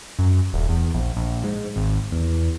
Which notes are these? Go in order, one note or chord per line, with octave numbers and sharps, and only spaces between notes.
F#2
D#1
E2
A#1
A#1
G#2
G#1
E2